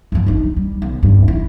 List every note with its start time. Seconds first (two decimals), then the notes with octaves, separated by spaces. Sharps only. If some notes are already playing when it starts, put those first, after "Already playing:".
0.12 G1 F3
0.26 D4 D#4
0.57 G3
0.82 B1
1.03 G2
1.28 E4